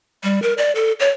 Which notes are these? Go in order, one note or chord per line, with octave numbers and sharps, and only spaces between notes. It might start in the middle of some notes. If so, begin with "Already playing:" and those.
G3
A#4
D5
A4
C#5